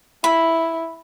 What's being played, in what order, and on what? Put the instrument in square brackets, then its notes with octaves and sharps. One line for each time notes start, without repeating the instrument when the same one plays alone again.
[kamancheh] E4 [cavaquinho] B5